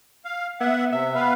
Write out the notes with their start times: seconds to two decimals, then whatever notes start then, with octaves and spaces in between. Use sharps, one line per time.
0.25 F5
0.60 B3 E5 F#5
0.93 C3 E5
1.15 B3 B4 F5